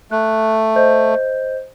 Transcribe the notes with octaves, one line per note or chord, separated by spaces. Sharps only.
A3 F#6
C5 D#5 G6